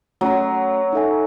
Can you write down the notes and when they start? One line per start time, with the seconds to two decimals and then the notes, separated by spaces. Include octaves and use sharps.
0.21 F#3 A3 C#4 F#4
0.93 D#4 A4 E5 G#5